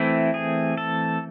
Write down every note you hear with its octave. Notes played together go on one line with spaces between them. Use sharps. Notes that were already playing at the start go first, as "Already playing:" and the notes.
Already playing: E3 A3 C4 E4
G#4
A4